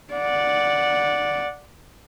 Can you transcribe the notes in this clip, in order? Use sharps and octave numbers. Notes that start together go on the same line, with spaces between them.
D5 F#5